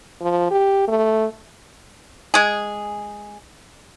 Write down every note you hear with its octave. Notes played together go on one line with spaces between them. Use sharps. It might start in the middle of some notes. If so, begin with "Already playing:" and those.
F3
G4
A3
G#3 G#4